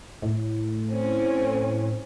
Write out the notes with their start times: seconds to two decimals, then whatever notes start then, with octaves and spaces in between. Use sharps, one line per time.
0.22 A2
0.90 C4 C#4